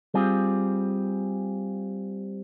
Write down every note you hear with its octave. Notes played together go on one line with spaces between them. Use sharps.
G3 C4 F4 G#4